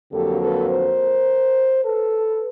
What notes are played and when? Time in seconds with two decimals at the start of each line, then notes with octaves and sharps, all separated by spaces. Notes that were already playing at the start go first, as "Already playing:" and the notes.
0.12 F2 D3 F#3 A#3 G4 A4
0.41 A4 B4
0.69 A#4 C5
1.84 A4 B4